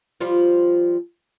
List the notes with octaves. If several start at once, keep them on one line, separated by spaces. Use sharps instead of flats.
F3 G3 F4